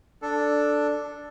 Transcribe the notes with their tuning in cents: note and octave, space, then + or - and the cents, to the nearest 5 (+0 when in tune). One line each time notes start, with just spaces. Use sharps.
D4 +0 A4 +0